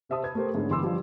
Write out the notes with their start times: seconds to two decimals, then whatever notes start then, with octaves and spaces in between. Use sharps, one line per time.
0.09 C3 C5 E5 A5 D#6 E6
0.23 B4 G#6
0.35 A3 G4 A#4 C5
0.55 G#2 D3 B3 C#4
0.70 G1 E3 C6 D6 E6
0.83 F3 G3